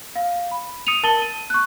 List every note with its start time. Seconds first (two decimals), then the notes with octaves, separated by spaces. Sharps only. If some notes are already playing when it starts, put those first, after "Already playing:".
0.15 F5
0.51 B5
0.87 D#6 C#7 D#7 F7
1.03 A#4 A5 A6 F#7 G7
1.22 D#7
1.50 C#6 F#6